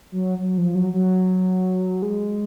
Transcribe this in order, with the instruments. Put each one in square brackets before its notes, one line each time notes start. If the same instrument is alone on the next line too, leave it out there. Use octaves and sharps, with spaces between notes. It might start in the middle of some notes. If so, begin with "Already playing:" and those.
[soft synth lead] F#3
F#3
F3
F#3
F#3
G#3